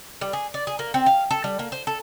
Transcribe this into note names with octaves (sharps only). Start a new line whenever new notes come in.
G3
G#4
D5
G#4
A#3
C4
F5
A4
G3
A#3
C5
A4